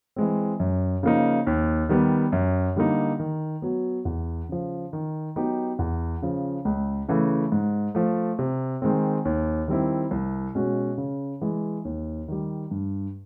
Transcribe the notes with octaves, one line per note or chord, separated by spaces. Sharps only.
E3 G#3 C4
F#2
C#3 F3 A#3 D#4
D#2
D#3 G3 B3
F#2
D3 G3 A#3 D#4
D#3
F#3 B3
E2
C#3 F3
D#3
F#3 B3 D#4 G4
E2
C#3 F3
C#2
C#3 E3 A3
G#2
F3 A3
C3
D#3 G#3 C4
D#2
D#3 G3 C4 E4
C2
B2 G#3 C#4 F#4
C#3
E3 G#3
D#2
D#3 G3
G2